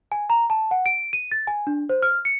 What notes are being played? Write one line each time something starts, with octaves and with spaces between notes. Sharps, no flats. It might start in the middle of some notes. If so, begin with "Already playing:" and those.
G#5
A#5
A5
F#5
D7
D#7
A6
G#5
D4
C5
F6
C#7